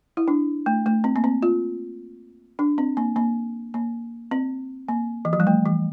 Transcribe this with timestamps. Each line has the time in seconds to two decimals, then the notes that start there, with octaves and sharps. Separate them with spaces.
0.17 E4
0.28 D4
0.66 A3
0.86 A3
1.04 C4
1.16 A#3
1.24 C4
1.43 F4
2.59 D4
2.78 C4
2.97 A#3
3.16 A#3
3.74 A#3
4.31 C4
4.89 A#3
5.25 E3
5.33 F3
5.40 G3
5.47 A3
5.66 E3